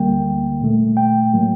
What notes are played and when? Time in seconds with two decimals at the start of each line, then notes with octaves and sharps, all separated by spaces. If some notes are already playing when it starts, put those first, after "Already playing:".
Already playing: D2 D3 G3 A#3 G5
0.61 A#2 A3
0.97 G5
1.34 A2 F#3 A#3